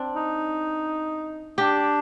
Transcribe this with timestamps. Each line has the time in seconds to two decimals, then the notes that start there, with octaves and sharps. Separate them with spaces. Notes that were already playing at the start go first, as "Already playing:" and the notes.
Already playing: C4 D4
0.16 D#4
1.58 D4 G4